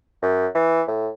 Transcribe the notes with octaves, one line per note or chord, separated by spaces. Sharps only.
F#2
E3
A2